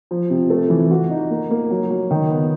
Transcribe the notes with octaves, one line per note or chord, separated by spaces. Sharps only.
F3
C3
A3
E3
F#4
D#4
A#3
A#3
F#3
F#3
D#3
B3